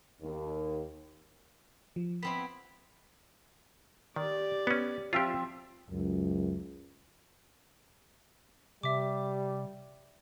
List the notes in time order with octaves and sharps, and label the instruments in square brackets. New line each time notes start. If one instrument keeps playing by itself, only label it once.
[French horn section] D#2
[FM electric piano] F3
[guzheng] B3 C4 E4 [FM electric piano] C6 B6
[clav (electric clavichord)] D#3 [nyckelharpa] G4 D5
[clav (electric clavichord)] B3 C#4
[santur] F3 C4 E5 [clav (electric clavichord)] F4 G4
[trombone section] C#2 F#2
[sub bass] C3 [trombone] G3 [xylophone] E5 D6